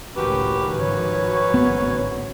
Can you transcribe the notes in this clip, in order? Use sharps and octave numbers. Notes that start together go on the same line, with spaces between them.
C#2 F#2 A2 D#3 F#4 G4 B4
G#2 D#3 F3 C#5
A1 D2 G#2 B3